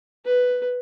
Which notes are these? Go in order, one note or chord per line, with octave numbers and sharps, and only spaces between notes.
B4